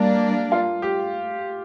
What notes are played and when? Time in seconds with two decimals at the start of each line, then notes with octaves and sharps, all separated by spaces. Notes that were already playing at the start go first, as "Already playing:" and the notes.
Already playing: G3 A#3 D4
0.52 F4
0.82 G4